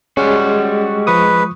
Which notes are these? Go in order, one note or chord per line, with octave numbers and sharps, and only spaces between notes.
G3 G#3 C#4 F#4
F3 B4 C#6 D#6